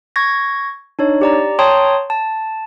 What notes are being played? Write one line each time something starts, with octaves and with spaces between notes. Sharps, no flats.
C#6 G#6 A#6
D4 D#4 C#5
G4 D5 A#5
C#5 G5 A5 A#5 C6 D#6
A5